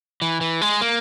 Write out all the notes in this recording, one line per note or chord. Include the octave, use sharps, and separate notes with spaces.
E3
E3
G#3
A#3